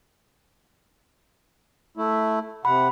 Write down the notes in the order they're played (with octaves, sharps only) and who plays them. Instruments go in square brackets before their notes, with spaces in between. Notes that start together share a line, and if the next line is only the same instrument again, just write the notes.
[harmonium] A3 E4
[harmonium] C3 F#5 [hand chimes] B5